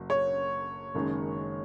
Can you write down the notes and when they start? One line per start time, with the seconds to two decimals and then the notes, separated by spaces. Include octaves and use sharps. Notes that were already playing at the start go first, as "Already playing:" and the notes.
Already playing: F#1 F#3
0.10 C#5
0.95 F#1 F#2 D#3 G#3